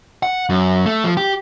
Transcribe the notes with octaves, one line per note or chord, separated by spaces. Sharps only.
F#5
F#2
A3
F3
G4